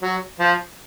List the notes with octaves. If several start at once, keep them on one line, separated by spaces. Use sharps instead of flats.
F#3
F3